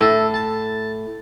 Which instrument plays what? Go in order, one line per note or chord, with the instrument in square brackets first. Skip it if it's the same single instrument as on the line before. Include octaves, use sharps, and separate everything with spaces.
[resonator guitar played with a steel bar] A2 [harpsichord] A4
[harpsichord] A5